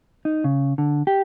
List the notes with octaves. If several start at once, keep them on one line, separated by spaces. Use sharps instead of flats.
D#4
C#3
D3
G4